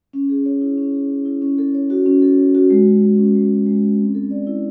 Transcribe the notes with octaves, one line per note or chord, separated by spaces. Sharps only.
C#4
G#4
C#5
E4
C#4
G#4
C#5
E4
C#4
A4
C#5
F#4
C#4
A4
C#5
F#4
G#3
F#4
G#3
C#4
G#3
F#4
G#3
C#4
C4
A4
D5
E4